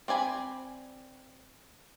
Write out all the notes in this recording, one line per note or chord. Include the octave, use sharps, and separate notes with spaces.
C4 D5 G#5 B5